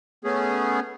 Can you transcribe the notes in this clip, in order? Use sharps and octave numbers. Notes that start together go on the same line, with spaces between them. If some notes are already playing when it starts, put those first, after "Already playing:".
A3 B3 C#4 G#4